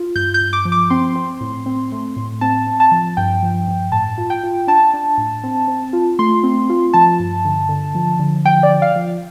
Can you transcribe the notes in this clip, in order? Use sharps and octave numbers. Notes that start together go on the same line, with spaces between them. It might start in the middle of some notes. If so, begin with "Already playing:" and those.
Already playing: F4
G2 G6
G6
G2
D6
F3
D6
C4 C6
C4
A2
C4
A3
A2
C4 A5
C4
A5
F3
G2 G5
F3
G2
A2 A5
F4
G5
F4
D4 A5
D4
A2
C4
C4
F4
A3 C6
C4
F4
F3 A5
G2
D3
D3
F3
D3
F3 G5
D5
F3
F5
F3